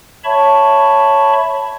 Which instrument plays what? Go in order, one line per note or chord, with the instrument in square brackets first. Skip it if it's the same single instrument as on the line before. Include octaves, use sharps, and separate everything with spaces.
[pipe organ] C#5 E5 A5 B5 C#6